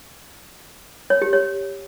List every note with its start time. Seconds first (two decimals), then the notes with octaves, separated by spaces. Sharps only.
1.10 C#5
1.22 G4
1.33 C#5